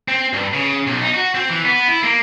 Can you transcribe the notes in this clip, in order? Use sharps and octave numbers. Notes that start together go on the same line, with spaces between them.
C4
G2
C#3
B1
D#4
F#4
C4
E3
B3
E4
A#3